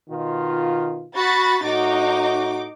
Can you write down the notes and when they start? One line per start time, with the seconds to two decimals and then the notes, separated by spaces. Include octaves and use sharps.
0.10 B2 D#3 F4
1.15 F#4 B5 A6
1.64 A2 D#4 F#4 D6